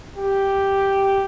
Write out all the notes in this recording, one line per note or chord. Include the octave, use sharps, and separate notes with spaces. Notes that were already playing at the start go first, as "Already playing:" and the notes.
G4